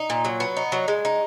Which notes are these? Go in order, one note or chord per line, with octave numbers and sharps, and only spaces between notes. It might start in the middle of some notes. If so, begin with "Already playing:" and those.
Already playing: D#4
A#2
F#3
B3
D#4
F#3
G#3
D#4